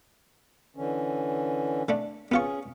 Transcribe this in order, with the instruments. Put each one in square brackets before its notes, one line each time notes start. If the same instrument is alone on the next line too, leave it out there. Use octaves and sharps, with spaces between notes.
[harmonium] D3 E3 C#4
[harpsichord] D3 A3 D4
[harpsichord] B3 F4 C#6 [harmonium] C#4 G#4